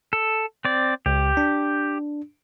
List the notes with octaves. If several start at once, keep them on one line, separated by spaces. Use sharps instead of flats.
A4
C4 D5
C#2 G4
D4